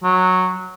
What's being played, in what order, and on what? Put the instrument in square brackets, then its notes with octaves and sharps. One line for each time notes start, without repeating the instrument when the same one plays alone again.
[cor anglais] F#3